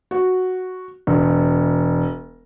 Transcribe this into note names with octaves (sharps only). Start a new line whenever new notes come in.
F#4
E1